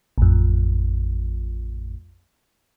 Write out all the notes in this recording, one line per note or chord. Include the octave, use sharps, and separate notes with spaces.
A1 F2